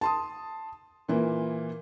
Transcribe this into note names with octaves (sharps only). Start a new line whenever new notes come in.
A5 C6 D#6
A#2 E3 A#3